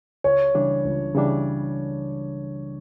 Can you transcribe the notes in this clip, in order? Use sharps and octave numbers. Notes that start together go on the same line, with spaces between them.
C#2 C#5
C#3 E3 G3 D4
C#2
C#3 E3 G3 D4